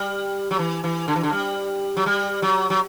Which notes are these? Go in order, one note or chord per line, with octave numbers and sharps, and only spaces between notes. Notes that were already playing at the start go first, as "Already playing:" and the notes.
Already playing: G3
F#3
E3
E3
D3
E3
D3
G3
F#3
G3
F#3
F#3